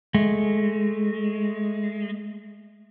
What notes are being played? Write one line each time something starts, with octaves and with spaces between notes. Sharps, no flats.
G#3 A3